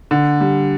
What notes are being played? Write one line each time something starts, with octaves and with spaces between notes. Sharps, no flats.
D3
G3